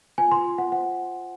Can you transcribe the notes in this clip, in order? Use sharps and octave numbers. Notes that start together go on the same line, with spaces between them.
F4 G#5
C6
F4
F4 F#5
C5 F#5